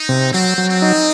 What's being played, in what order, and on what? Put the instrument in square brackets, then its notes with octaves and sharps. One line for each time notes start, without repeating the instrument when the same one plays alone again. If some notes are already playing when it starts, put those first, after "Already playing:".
Already playing: [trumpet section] D#4
[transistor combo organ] C3
[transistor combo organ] F#3 [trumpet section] C4
[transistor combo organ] F#3
[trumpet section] C4
[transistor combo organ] D#4